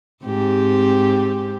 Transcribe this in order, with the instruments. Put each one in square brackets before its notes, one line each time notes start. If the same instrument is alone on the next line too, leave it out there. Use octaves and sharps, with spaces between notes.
[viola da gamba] G#2 C4 G4